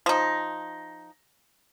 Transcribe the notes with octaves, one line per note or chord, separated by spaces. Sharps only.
F3 D#4